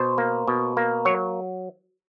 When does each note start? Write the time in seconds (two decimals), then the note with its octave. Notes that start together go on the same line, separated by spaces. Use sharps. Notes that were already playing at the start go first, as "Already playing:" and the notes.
Already playing: B2 C5
0.18 A#3
0.48 B2
0.77 A#3
1.05 F#3 C#5